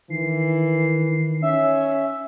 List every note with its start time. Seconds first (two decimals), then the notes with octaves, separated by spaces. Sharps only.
0.10 D#3 E3 C7
1.42 C#4 E5